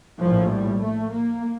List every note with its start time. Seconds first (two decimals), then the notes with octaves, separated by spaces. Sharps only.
0.20 A#1 A2 F3
0.51 G3
0.82 A3
1.11 A#3